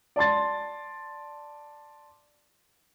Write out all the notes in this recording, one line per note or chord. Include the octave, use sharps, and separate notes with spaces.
D5 A5 C6 A6